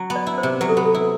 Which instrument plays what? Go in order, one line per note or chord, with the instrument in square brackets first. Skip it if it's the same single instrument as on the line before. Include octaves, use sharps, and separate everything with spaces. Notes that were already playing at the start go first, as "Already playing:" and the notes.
Already playing: [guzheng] F#3
B3
[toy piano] D5
[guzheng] E4
[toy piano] C5
[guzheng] C3
[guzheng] F#3 [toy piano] B4
[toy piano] A4
[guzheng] B3 [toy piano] G4
[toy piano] A4
[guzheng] E4